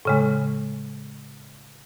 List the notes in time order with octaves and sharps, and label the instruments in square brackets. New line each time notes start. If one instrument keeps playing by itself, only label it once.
[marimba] A2 C#3 G#3